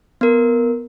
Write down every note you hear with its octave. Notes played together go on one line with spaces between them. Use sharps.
B3 A#4